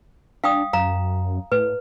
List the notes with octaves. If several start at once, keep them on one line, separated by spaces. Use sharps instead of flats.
D4 F5 G5 D#6
F#2 F5 A#5
A2 B4